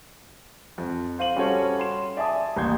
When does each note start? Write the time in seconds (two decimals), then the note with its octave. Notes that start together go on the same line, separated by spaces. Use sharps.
0.78 F2
1.19 C5 F5 D#7 F#7
1.36 G3 C#4 F#4 A4 C5 C#5
1.80 C6 E7
2.17 D5 E5 G#5 A5 D#6
2.56 A1 D#2 C6 G6 G#6